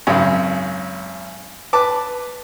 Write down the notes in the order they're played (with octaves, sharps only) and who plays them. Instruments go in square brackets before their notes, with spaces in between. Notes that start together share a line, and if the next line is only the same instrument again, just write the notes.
[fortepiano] G#1 F#2 C#3
B4 A5 D6